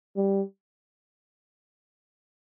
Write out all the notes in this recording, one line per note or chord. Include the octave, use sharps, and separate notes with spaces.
G3